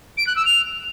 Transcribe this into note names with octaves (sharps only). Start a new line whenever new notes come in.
D7
F#6
E6
F7